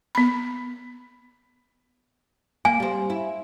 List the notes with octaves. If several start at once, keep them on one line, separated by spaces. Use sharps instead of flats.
B3 B5
A#3 G#5
G3 C4
E4